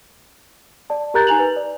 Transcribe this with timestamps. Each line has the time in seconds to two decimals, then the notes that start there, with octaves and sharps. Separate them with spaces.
0.90 D5 A5
1.14 G4 A#4 A#5 F#6 G6 A6
1.27 D#4 G#5 A#5 F7 F#7
1.39 B4
1.56 D5